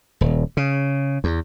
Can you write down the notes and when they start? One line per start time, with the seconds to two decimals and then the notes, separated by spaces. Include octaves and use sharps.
0.21 D#1
0.57 C#3
1.24 E2